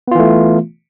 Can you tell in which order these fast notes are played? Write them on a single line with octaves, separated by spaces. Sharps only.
B3 F4 E3 A3